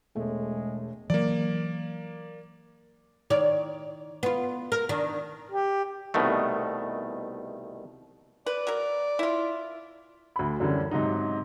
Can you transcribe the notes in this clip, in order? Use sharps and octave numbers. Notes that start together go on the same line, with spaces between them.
E1 G#3 A3
E3 F#3 A#3 D5
D#3 C#5 D5
B3 F4
A#4
D#3 D4
G4
C2 B2 D#3 A3
B4 D5
F#3 A#4
E4 F4
D2 B5
F#2 D3 E3 G3 C#4
G#2 C3 F#3 D#4